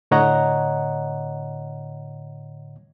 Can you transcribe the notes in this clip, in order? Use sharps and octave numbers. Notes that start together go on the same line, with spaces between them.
A2 D3 C#5 D#5 F#5 A#5